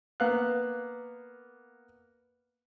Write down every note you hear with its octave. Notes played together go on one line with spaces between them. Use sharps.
A#3 B3 F5 F#6